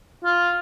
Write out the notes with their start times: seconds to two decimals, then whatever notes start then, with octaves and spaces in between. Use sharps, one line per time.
0.24 F4